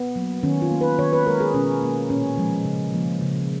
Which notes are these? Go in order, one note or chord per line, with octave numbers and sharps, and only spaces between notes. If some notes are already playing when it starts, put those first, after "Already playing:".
Already playing: B3
F#3 A#3
D#3 C#4
F4
A#3
B4
D#3 C#5
B4
G#3 A#4
G#4
B2 C#4
A#3
A#2 C#4
F3 G#3
C#3
F3 A#3
C#3